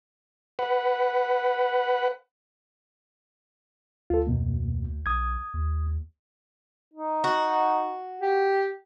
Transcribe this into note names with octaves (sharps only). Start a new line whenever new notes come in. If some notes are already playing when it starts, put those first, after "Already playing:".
B4 F#5
D2 F4 A4
F2 B2 A#3
B1 D#6 G#6
D#2
D#4
F#4
G4